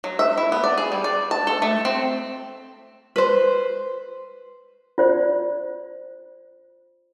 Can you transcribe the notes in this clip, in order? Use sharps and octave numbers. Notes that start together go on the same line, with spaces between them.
F#3
E5
E4
B3
D5
G#4
G3
D5
A5
A4
A3
C4
B4 C5
F4 C5 D5